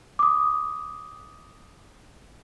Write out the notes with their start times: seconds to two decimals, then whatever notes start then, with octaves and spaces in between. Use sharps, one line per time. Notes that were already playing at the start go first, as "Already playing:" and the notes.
0.19 D6 D#6